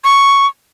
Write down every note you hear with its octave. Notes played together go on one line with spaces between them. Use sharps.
C#6